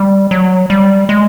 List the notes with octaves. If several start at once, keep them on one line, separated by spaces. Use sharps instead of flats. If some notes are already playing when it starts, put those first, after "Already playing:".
Already playing: G3
F#3
G3
G#3